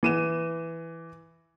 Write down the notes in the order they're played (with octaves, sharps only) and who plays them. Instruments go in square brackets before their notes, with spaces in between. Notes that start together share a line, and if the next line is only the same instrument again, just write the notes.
[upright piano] E3 D#7 E7